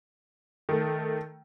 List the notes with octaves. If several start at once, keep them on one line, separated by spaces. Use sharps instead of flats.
D#3 A3